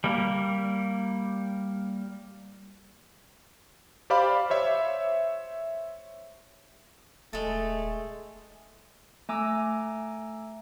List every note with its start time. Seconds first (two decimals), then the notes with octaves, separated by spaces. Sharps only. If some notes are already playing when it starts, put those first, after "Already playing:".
0.04 G3 A#3
4.10 G4 C5 D5 F5 B5 D6
4.50 C5 C#5 E5
7.33 D#1 G#3 A3 A4
9.29 A3 G#5 A#5 D6 E6